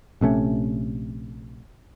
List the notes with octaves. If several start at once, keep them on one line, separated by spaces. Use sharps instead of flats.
A#1 C3 A3 C#4